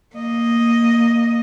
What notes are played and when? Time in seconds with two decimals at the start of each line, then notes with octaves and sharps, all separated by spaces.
0.16 A#3 D#5